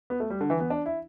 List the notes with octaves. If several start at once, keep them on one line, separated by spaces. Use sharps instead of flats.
B3
A3
G3
D3
E3
B3
D4
E4